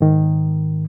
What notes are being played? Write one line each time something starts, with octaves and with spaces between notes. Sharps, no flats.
G#2 D#3